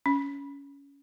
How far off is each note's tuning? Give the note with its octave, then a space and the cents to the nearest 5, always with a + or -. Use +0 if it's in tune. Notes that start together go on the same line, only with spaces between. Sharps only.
C#4 +20